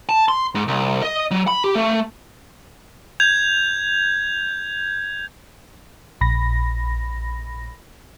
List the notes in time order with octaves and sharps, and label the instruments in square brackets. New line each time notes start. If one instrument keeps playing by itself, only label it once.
[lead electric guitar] A5
C6
G#2
C2
D#5
F#3
B5
G4
A3
[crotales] G6 G#6 F7
[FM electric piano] A#1 B5 A#6